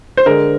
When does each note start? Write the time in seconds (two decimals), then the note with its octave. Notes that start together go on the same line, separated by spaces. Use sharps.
0.17 C5
0.26 D3 G#3 A#4